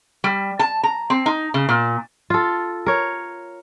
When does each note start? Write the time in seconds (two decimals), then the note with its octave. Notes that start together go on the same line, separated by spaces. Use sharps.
0.24 G3
0.59 A5
0.83 A#5
1.10 C4
1.26 D#4
1.54 C#3
1.69 A#2
2.30 F4 A4
2.86 A#4 C#5